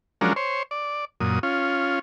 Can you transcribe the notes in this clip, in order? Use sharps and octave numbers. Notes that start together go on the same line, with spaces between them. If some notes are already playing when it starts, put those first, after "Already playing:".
F3 F#3 G#3 C#4 D4 A#4
C5 C#5
D5
F#2 A#2 D#6
C#4 F4